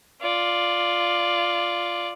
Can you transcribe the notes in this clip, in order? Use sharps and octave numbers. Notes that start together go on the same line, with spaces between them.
F4 D5